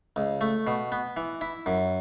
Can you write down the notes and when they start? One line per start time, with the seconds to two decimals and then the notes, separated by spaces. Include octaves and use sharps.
0.16 C#2
0.41 A3
0.67 B2
0.92 B3
1.17 E3
1.41 E4
1.66 F#2